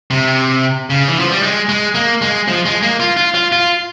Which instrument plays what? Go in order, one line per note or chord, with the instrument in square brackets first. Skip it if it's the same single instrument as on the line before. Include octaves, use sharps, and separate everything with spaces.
[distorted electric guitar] C3
C#3
E3
F3
G3
G#3
G#3
A#3
G#3
F3
G#3
A#3
F4
F4
F4
F4